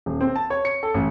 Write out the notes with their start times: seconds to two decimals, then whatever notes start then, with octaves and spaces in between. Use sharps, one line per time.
0.06 D#1
0.21 C4
0.36 A5
0.50 C#5
0.65 C#7
0.83 A4
0.94 A1